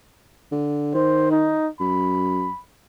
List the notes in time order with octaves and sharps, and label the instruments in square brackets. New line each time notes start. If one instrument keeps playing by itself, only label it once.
[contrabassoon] D3
[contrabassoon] D#3 [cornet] C5
[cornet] D#4
[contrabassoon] F#2 [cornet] B5